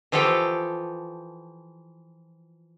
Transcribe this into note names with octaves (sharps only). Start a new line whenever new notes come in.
E3 F3 F4 G4 A4 G5